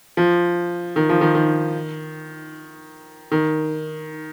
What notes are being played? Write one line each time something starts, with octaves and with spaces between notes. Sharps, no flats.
F3
D#3
F3
D#3
D#3
D#3